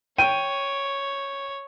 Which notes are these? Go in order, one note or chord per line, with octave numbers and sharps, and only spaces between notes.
C#5 G5 D#7